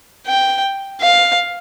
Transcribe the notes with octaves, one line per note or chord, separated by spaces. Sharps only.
G5
F5